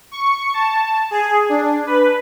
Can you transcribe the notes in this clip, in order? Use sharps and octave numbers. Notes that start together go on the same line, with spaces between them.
C#6
A5
G#4
D4
B4